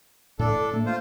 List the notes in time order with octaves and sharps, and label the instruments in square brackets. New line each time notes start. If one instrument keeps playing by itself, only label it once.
[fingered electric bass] A2 [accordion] D4 A4
[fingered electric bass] A3 A#3
[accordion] F4 C5